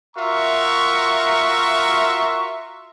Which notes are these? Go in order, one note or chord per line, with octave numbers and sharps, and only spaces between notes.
F4 F#4 A#4 E5 A#5 C#6